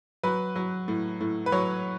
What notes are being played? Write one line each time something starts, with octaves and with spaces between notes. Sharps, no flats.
F#3 B4
F#3
A2
A2
B4
F#3 C#5